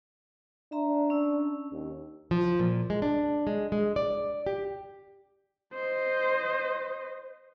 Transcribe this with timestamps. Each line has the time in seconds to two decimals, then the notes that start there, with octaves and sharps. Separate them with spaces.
0.72 D4 E5 A#5 C6
1.10 C#4 E6
1.72 D#2
2.31 F3
2.59 A#2
2.90 G#3
3.02 D4
3.47 G#3
3.72 G#3
3.96 D5
4.46 G4
5.74 C5 D#5